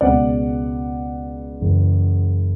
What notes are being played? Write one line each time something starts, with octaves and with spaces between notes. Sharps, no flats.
C#2 B2 G#3 D5 F#5
F#1 F#2 C#3 E3